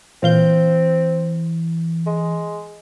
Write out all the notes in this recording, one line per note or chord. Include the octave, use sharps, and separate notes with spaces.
A#2 E3 C4 F5 G6
G#3